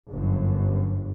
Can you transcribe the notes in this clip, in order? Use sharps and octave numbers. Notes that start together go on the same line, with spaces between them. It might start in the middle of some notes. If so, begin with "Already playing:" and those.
G1 F#2